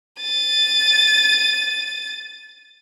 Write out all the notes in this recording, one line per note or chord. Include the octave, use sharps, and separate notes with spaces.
A6 D#7